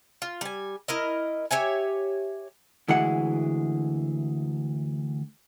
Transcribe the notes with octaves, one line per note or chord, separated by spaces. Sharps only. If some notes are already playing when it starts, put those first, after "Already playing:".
F4
G3 G#5
E4 A#4 D#5
G4 C#5 E5 G#5
D2 E3 G#3 F#5